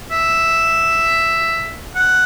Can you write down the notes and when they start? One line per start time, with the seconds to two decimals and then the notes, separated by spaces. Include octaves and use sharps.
0.11 E5
1.96 F#5